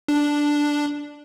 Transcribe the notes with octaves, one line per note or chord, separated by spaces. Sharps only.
D4